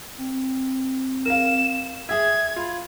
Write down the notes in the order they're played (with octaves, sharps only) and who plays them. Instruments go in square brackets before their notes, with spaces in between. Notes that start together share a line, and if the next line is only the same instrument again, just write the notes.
[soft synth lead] C4
[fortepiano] A#4 F5 [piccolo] E7
[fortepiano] G#4 E5 [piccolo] G#6
[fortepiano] F4 [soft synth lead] B5